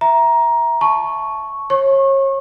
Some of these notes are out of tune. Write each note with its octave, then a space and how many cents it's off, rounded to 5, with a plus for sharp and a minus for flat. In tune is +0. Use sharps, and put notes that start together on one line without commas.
E5 +0 A#5 +15
A5 -15 C#6 +0
C#5 -35 C#6 -30